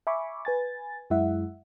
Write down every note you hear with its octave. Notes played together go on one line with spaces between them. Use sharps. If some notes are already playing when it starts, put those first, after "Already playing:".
E5 G#5 B5 C#6 D6
B4 G#5 A6
F#2 G#3 E4 E5 F#5